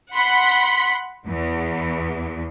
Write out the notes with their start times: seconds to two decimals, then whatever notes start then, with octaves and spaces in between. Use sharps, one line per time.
0.14 F#5 B5 C6 B6
1.27 E2